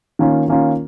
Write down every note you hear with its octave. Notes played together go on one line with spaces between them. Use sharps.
D#3 A#3 C#4 F4
D#3 A#3 C#4 F4